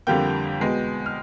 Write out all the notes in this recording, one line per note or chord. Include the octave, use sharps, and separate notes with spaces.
F2 D3 G3 A#3 G5 G6
E2 B2 G#3 B3
F6